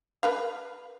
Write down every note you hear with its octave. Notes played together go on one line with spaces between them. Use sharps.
A#4 B4 F5